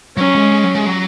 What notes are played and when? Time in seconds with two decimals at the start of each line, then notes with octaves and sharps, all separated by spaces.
0.17 F#3 C#4
0.35 G#3
0.52 G#3
0.64 F#3
0.75 G#3
0.86 F#3